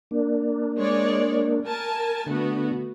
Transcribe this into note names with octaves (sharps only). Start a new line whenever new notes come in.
A#3 D4
G#3 C#5 D5
A#4 G#5 A5
D3 A3 B3 F#4